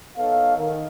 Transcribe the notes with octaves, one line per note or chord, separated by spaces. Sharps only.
B3 D#4 A4 C#5 F5
D#3